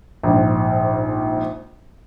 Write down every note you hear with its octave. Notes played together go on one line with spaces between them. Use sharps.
A#1 G#2